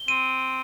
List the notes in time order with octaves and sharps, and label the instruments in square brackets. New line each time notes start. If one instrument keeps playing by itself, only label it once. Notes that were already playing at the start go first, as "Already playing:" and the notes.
Already playing: [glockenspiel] G7
[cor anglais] C4 [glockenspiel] D#7